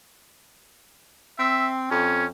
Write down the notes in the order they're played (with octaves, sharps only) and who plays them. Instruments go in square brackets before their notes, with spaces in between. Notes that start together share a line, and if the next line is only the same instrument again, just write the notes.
[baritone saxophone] C4 [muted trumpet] E5
[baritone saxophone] F2 [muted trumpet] C#4